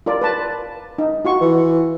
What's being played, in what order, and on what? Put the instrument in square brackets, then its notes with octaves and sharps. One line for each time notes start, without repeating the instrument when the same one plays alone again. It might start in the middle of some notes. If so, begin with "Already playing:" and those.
[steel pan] F4 A#4 D5
B4 A5
D#4
F4 F#4 C#6
[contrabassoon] E3